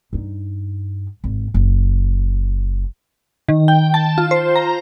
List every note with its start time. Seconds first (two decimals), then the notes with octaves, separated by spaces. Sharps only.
0.13 G2 D#4
1.24 G#1
1.54 F#1
3.49 D#3
3.68 G5
3.94 A5
4.18 F4
4.31 C5
4.56 A#5